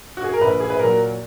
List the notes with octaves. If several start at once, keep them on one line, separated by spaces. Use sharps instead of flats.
F#4
G#4
A#4
A#1 B4
G#4
B4
A#2 F#3 A#4